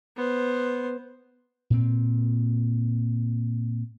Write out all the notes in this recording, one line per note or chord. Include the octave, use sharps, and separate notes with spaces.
B3 C5
A#2 C4